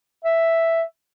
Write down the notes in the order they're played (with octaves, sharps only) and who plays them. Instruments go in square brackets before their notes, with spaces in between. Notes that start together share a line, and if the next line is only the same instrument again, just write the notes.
[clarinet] E5